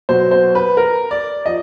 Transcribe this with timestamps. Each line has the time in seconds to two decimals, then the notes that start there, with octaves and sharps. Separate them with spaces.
0.09 B2 F#3 C5
0.31 C5
0.55 B4
0.77 A#4
1.11 D5
1.46 F3 D#5